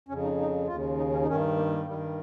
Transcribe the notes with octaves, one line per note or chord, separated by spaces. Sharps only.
F2 C#3 C#4
D#4
D#4
D#2 C#3 F4
D#4
C#4
D#4
G2 D#3 C#4
A#3
A#3
G2 D#3 G3